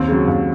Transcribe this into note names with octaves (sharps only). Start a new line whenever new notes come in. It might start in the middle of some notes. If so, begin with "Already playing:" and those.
Already playing: D#2 C4
C#3 F#3
D#2